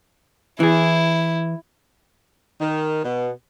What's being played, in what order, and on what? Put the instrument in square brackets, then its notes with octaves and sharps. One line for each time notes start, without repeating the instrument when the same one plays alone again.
[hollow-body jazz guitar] E3 G#4 [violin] E4
[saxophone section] D#3
B2